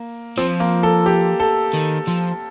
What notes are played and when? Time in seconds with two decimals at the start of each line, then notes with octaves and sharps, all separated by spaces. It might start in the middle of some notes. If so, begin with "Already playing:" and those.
Already playing: A#3
0.37 F3 C4
0.60 A#3
0.83 A4
1.06 G4
1.40 A4
1.74 D#3
2.08 F3